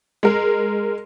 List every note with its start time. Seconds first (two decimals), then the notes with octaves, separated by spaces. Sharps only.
0.23 G#3 A#4